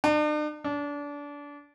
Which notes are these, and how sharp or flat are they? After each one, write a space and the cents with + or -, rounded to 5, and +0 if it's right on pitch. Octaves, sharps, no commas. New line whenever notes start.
D4 +45
D4 -25